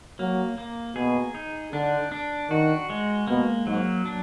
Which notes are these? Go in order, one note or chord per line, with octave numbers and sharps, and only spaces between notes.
F#3 A#3
A#3
B2 G#4
D#4
D3 D4
D4
D#3 F#4
G#3
B2 A#3
G#2 F#3
D4